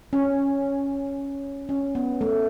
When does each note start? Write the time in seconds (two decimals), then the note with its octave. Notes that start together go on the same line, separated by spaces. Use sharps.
0.13 C#4
1.69 C#4
1.95 B3
2.21 A3